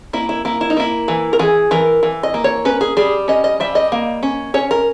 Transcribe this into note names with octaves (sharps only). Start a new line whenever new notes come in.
A#3 E4
E4
A#3 E4
E4
D#4
A#3 E4
E3
A#4
E3 G#4
E3 A#4
E3
D#5
A#3
C#5
C#4 B4
G#4
G3 G#4
C#4 D#5
D#5
G3 E5
D#5
A#3
C#4
C#4 C#5
A#4